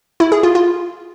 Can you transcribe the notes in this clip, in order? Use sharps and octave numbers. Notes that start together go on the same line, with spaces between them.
E4
G#4
F4
F4